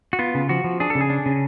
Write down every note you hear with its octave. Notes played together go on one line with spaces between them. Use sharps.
F#4
B3 F4
C#3
F3 F#4
F3
D4 G#4
A4
C#3
G#4
D4
C#3